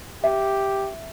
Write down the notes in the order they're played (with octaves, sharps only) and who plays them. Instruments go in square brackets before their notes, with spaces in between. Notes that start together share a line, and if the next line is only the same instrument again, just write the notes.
[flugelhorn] G4 [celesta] E5